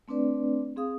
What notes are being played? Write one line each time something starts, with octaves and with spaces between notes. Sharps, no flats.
A3 C4 D4 B4 D5
C4 G#4 F5 D#6